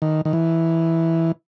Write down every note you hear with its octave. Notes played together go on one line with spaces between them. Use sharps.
D#3
D#3
E3